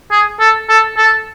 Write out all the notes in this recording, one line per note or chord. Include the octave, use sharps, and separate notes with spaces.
G#4
A4
A4
A4